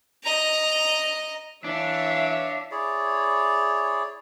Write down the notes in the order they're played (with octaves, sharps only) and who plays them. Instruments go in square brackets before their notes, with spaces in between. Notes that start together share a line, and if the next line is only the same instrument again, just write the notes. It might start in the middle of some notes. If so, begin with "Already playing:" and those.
[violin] D#5 A#5
[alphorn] E3 [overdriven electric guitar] D4 [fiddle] C#5 F5 [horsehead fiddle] E5
[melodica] E4 G#4 C#5 D5